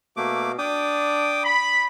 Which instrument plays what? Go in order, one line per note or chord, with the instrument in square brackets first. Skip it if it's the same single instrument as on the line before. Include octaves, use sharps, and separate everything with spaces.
[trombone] B2 [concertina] A3 A#3 D6
[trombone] D4 [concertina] G5 D6 D#6
[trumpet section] B5